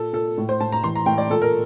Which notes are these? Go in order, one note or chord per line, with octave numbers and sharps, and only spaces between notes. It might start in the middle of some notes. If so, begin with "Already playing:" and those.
Already playing: A#2 A4
A#2 A4
A2
C5
A2 A5
A#5
E3 C6
A#5
A2 G5
D5
A#2 A4
A#4